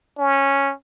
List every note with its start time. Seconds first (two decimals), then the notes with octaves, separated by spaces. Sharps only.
0.18 C#4